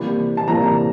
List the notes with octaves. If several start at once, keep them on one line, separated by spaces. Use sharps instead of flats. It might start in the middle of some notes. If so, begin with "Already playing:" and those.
Already playing: C3 E3 G3 A#3 B5
A5
C3 E3 G3 A#3 A#5